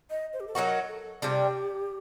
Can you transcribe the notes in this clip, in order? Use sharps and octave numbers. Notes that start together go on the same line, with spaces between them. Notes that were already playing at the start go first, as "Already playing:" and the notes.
D#5
C5
G4
A4
F#3 A3 D#4 F#4 A#4
A4
C3 G3 D4 G4